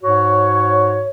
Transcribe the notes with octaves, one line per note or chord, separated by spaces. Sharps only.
G#2 F#4 C#5